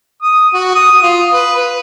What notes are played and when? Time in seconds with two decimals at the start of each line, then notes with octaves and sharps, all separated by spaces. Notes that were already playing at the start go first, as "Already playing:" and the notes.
0.22 D#6
0.54 F#4
0.75 D#6
1.03 F4
1.32 B4
1.56 B4